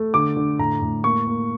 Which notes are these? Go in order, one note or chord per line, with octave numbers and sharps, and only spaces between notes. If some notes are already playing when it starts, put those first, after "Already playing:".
Already playing: A3
D3 D6
D3
A2 A#5
A2
A#3 C#6
A#3